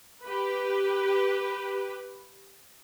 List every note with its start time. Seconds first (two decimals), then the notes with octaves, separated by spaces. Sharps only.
0.22 G4 B4